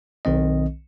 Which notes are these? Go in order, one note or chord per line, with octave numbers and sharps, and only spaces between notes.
B1 D#3 C4 D#5